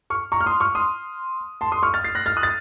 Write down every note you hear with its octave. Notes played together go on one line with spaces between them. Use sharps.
C#6 F6
A#5 C#6
F6
C6 D#6
C#6 F6
C6 D#6
A5 C6
C6 D#6
C#6 F6
F6 A6
A6 C7
F#6 A#6
F6 A6
D#6 F#6
A6